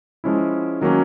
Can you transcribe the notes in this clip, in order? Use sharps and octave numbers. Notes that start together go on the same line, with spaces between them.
F3 G#3 C#4 E4
D#3 F#3 A#3 C#4